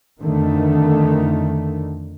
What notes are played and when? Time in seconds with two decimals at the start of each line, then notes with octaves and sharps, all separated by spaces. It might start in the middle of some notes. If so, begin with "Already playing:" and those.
0.22 F2 D3 D#3 A3